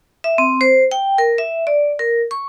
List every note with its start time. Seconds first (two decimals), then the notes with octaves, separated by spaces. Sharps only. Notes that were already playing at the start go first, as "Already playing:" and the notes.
0.24 E5
0.38 C4
0.61 C5
0.91 G5
1.18 A#4
1.38 E5
1.67 D5
1.99 A#4
2.31 C#6